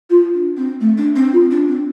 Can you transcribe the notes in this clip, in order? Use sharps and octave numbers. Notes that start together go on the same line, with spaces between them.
F4
D4
C4
A3
D4
C4
F4
D4
C4